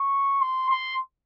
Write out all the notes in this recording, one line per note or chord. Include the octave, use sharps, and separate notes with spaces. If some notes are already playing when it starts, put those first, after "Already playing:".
Already playing: C#6
C6
C6